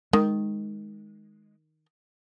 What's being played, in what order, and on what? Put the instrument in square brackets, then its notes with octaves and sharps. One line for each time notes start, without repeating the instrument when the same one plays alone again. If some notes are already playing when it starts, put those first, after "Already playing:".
[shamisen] D#3 [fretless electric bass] G#3